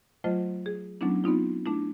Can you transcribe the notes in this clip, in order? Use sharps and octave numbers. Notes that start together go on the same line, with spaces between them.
F#3 A3 F4 C5 D#5
G#4
F#3 A3 B3 C#4 D4 E4
B3 C4 D#4 F4
A3 D4 E4